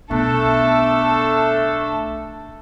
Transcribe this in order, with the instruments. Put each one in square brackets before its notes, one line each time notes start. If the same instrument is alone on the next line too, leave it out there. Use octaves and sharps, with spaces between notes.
[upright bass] B1 B3 [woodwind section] A3 D4 [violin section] A4